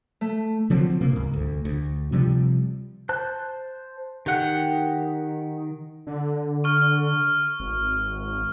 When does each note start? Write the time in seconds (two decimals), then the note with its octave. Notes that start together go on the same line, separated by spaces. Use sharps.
0.21 A3
0.70 D3 F3 F#3 C4
1.01 C3 A#3
1.13 C#2 G#2
1.34 D2
1.65 D2
2.12 C3 F3 G3
3.09 C5 A5 F#6
4.26 D#3 G4 F#5
6.07 D3
6.64 C#6 F6
7.60 G#1